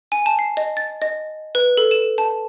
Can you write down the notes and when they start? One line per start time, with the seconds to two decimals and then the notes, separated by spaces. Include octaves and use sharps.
0.12 G#5
0.26 A5
0.39 C7
0.57 D#5
0.77 A6
1.02 D#5
1.55 B4
1.77 A4
1.91 E7
2.18 A5